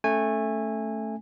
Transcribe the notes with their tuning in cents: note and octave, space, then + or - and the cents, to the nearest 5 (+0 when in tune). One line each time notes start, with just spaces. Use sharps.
A3 +0 C#4 +0 G#5 -20